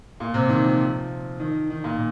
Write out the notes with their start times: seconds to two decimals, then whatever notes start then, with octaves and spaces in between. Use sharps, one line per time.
0.20 A#2
0.34 C3
0.49 D#3
0.64 F3
1.40 D#3
1.70 D#3
1.84 A#2